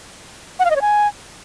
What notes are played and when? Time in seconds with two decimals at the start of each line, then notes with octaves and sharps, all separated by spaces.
0.60 F#5
0.65 F5
0.70 D#5
0.76 C#5
0.81 G#5